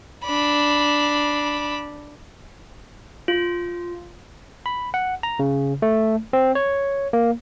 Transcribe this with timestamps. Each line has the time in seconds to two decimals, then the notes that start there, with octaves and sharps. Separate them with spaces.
0.24 D4 B5
3.28 F4
4.66 B5
4.94 F#5
5.23 A#5
5.39 C#3
5.82 A3
6.33 C4
6.55 C#5
7.13 A#3